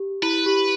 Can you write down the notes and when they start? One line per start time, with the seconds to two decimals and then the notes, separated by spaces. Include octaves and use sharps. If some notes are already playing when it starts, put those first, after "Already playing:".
Already playing: G4
0.22 E4 B4
0.46 G4